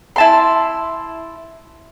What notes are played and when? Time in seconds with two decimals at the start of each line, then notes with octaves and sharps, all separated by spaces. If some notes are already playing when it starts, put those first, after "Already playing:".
0.16 E4 A5 C6